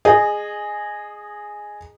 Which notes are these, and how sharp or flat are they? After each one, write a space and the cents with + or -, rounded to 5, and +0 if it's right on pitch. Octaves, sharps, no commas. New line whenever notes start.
G#4 +0 D#5 -20